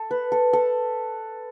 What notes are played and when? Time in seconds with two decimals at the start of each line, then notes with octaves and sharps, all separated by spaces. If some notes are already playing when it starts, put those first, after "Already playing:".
Already playing: A4
0.11 B4
0.32 A4
0.53 A4